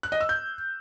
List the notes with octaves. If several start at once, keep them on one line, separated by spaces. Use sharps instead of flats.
F#6
D#5
E6
G6